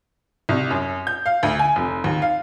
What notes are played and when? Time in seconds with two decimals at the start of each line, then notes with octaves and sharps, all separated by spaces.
0.49 C2
0.70 F#2
1.07 G6
1.26 F5
1.43 D2
1.59 G#5
1.76 F1
2.04 D#2
2.22 F5